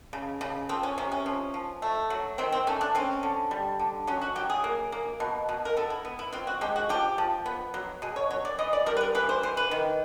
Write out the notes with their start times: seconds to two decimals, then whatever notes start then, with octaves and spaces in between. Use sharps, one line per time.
0.13 C#3
0.41 C#3
0.69 F3 C4
0.83 C#4
0.98 C3 C#4
1.12 C#4
1.26 F3
1.54 F3
1.82 A3
2.10 F#3
2.38 D#3 C4
2.52 C4
2.67 A3 C#4
2.81 D4
2.95 C4 C#4
3.23 D3
3.51 G3
3.79 D3
4.07 F#3 C#4
4.22 F#4
4.36 F#3 G4
4.50 G#4
4.64 A#3
4.92 A#3
5.20 B2
5.49 B2
5.65 A#4
5.77 B3 A4
5.90 E4
6.05 B3
6.19 E4
6.33 C4 F4
6.47 F#4
6.61 G#3 G4
6.76 F#4
6.89 F3 G4
7.18 F3
7.46 B3
7.74 F#3
8.02 B2 G#4
8.16 C#5
8.31 F#3 C#5
8.45 D5
8.59 E3 D#5
8.73 D5
8.86 G3 A#4
8.97 B4
9.01 A#4
9.15 E3 B4
9.29 C5
9.43 E3 C5
9.57 B4
9.71 D#3